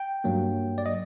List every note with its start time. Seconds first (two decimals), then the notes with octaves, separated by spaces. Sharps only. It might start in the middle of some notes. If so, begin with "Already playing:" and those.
Already playing: G5
0.24 G2 F#3 A#3
0.78 D5
0.86 D#5